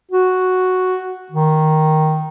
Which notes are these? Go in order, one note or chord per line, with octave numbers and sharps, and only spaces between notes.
F#4
D#3